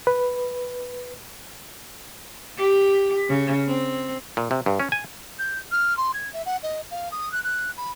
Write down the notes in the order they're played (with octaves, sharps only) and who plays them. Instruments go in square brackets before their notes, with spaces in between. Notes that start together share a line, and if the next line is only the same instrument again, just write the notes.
[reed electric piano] B4
[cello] G4
C#3
C4
[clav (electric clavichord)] A#2
C3
G2
C#4
G#5
[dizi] G6
F6
C6
G#6
E5
F#5
D#5
F5
D#6
F#6
F#6
B5